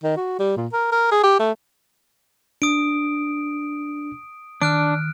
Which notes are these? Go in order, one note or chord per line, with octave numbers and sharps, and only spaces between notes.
D#3
F#4
G3
A#2
A#4
A#4
G#4
G4
A3
D4 D#6 D7
D#3 D4 F6 F#6 D7